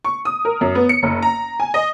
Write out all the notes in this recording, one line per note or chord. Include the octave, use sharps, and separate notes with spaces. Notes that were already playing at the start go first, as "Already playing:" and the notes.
C#6
D#6
A#4
F#2
B3
C#7
F#1
A#5
G#5
D#5